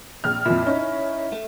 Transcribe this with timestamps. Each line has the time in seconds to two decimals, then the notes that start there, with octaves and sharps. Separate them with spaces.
0.24 A#1 F6
0.46 F2 A#2 E4
0.66 C#4 D#4
1.32 A3